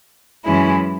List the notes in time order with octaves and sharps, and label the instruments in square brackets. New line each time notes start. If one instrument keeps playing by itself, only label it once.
[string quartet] F#2 E3 G#3 C#4 E4